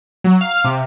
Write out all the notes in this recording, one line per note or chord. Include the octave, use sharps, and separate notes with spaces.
F#3
F5
C3